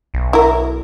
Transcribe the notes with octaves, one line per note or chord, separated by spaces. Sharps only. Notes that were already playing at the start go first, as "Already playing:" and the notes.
B1
E4 A#4